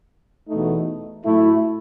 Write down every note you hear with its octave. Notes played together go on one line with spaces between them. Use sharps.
E2 B2 A3 D#4
A2 F#3 A3 E4